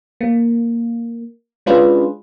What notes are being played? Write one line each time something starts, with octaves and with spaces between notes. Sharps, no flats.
A#3
G#3 C#4 D4 F4 G#4 B4